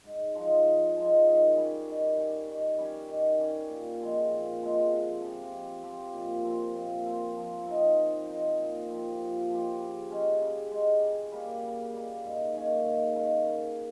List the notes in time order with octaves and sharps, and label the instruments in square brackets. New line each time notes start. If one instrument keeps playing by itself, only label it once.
[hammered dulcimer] G#2
F3 G#3 D#4
G#2
F3 G#3 D#4
D#3
G3 C#4 G4
D#3
G3 C#4 G4
D#3
G3 C#4 G4
D#3
G3 C#4 G4
A#2
F3 G#3 C4
A#2
F3 G#3 C4
C3
F3 C4 G4
C3
F3 C4 G4
A#2
F3 C4
A#2
F3 C4
F3
C4 D#4 A#4
F3
C4 D#4 A#4
A#2
F3 C4 G4
A#2
F3 C4 G4
C#3
G#3 C#4 G4
C#3
G#3 C#4 G4
C#3
G3 A#3
C#3
G3 A#3
G#2
D#3 A#3 C#4
G#2
D#3 A#3 C#4
C#3